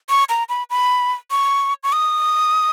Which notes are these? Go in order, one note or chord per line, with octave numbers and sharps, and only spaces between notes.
C#6
A#5
B5
B5
C#6
C#6
D#6